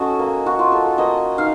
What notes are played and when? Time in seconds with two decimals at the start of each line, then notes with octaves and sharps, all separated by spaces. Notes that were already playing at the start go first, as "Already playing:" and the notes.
Already playing: C#4 F#4 A4 D#5
0.19 A#3
0.46 F#4
0.59 F4
0.72 A4
0.98 A#3 D#5
1.38 D#4 F5